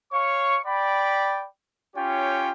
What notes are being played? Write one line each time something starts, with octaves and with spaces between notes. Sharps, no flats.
C#5 F5 C#6
D5 G5 B5
C#4 F4 G4 C#5 G5